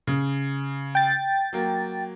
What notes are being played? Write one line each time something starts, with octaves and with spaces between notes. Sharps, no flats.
C#3
G5 A6
F#3 A#3